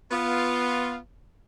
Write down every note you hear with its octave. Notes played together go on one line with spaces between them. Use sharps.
B3 F4